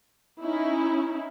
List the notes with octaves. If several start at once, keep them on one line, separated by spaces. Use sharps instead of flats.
C#4 D#4 E4